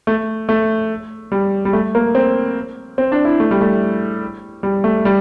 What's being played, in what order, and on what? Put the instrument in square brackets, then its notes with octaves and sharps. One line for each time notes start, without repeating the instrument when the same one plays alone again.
[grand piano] A3
A3
G3
G3
A3
A#3
C4
C4
D4
E4
A3
G3
A3
G3
A3
G3